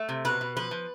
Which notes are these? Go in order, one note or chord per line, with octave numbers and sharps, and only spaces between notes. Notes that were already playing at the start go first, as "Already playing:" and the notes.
Already playing: A3
C3
B2 B4
B2
F3 B4
F3